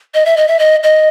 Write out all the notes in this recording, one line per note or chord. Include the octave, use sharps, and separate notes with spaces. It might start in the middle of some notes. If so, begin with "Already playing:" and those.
D#5
E5
D#5
E5
D#5
D#5